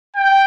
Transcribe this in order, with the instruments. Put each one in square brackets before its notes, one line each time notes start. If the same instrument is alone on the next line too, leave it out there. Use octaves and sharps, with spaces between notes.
[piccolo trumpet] G5